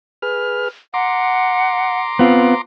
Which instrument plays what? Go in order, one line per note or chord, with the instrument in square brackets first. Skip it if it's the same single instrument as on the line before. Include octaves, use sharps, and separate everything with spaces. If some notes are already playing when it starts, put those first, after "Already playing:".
[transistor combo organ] G#4 B4 F6
[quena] F#5 [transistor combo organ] A#5 C6 D6
[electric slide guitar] B3 C4 F4